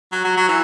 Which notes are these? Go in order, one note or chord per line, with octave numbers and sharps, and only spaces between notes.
F#3
F#3
F#3
E3